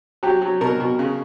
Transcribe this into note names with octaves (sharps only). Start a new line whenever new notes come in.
F#3 G4
F#3
B2 A#4
B2
C#3